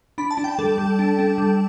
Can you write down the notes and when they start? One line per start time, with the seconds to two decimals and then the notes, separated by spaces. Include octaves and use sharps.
0.18 D4 B5
0.31 A5
0.37 D4
0.44 G5
0.59 G3 A4
0.78 G3
0.99 D4
1.19 D4
1.38 G3